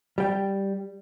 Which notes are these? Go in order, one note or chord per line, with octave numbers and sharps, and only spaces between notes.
G3 G5